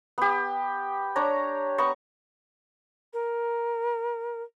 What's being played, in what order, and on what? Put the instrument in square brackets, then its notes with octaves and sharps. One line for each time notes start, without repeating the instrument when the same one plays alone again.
[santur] B3 G4
D4 C#5 A#5
B3 A#5 C#6
[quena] A#4